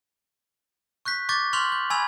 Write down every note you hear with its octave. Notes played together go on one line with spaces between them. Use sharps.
C#6 F#6 G6 B6
C#6 D6 G6 A6
C6 C#6 F6 G6 F7 F#7
G6
G#5 B5 C#6 E6 G#6 F7